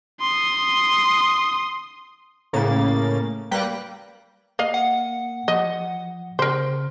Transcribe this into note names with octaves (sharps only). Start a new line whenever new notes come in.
C6 D#6
A2 C#3 A#3 A6
G3 A#3 B4 G5 F#6 A#6
A#3 D#5 F5
F#5
F3 D#5
C#3 A#4 C5